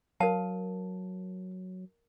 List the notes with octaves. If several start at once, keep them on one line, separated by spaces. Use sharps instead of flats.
F#3 A#4 F5 A5